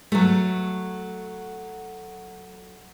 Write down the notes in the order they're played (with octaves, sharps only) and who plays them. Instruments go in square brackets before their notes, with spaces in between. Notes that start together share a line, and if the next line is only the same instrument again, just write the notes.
[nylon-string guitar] F#3 A3